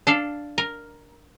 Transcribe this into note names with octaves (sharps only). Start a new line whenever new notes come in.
D4 A4 F5
A#4